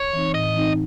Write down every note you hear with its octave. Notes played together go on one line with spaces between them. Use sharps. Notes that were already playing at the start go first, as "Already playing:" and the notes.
Already playing: C#5
E3 C4 D#4
A2 D#5
E3 C4 D#4